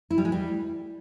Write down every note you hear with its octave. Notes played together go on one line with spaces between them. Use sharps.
E4
G3
G#3
G3